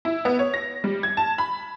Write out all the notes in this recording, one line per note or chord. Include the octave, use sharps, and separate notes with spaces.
E4
B3
C#5
A#6
G3
G#6
A5
B5